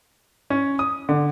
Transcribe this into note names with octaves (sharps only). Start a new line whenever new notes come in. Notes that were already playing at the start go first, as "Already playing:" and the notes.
C#4
D#6
D3